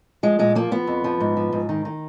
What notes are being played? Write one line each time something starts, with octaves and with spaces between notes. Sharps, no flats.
F3 G#3
A#2 G#3
F3 A#3
F3 B3
F2
F3
G#2
F3
G#2
D#3
D#3